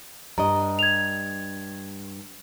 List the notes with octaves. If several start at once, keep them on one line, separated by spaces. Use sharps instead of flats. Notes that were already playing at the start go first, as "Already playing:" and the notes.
G2 D#5 A#5
G#6 F7